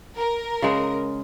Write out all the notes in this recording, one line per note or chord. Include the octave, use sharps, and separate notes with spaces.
A#4
C#3 G#3